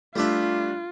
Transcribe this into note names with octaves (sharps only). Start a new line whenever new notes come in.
G3 A3 D4 F4 G4 E5